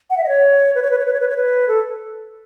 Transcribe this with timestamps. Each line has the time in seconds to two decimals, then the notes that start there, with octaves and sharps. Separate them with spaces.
0.10 F#5
0.18 E5
0.23 D#5
0.29 C#5
0.75 B4
0.82 C#5
0.91 B4
0.98 C#5
1.06 B4
1.13 C#5
1.20 B4
1.29 C#5
1.37 B4
1.68 A4